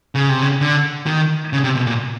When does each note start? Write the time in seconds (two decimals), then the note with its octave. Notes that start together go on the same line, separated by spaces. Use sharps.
0.15 C#3
0.29 C3
0.42 C#3
0.61 D3
1.06 D#3
1.53 C#3
1.64 C3
1.75 B2
1.87 A#2